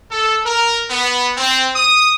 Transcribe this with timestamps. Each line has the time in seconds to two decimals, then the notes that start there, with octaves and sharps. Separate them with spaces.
0.11 A4
0.46 A#4
0.90 B3
1.37 C4
1.76 D#6